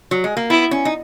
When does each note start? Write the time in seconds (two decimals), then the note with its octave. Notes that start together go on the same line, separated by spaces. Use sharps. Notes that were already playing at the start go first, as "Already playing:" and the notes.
0.11 F#3
0.24 G#3
0.37 A#3
0.50 B3 E4
0.71 C#4
0.85 D#4